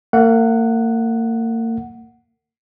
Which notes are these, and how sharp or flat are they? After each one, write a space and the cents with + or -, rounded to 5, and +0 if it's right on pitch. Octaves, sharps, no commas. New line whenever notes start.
A#3 -40 F#5 +0